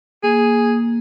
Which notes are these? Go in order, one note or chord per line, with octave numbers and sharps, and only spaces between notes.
A#3 G#4